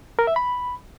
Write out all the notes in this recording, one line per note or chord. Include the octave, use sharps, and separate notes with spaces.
A#4
E5
B5